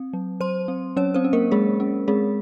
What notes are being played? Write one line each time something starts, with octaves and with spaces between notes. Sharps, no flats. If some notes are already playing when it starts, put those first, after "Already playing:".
Already playing: C4
F#3
F#3 C5 C6
C4
F#3 C#4 C#5
C4 C5
C#4
A#3 A#4
G#3 C#4 G#4
C#4
G#3 C4 G#4